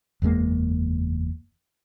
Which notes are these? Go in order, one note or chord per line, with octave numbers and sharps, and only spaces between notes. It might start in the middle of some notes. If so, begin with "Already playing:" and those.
F#1 E2 G#3 A#3